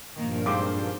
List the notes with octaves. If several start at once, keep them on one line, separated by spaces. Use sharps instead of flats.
G2 A#2 D#3 F3 A#3
G#2 D#3 C4 C5 F5 D6